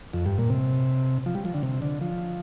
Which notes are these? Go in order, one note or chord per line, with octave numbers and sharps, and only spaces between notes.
F2
G2
A#2
C3
F3
G3
F3
D3
C3
D3
F3